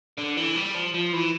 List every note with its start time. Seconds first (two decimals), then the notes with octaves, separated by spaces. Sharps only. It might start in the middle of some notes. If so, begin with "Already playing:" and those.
0.19 D3
0.37 E3
0.56 G3
0.75 F3
0.94 F3
1.13 E3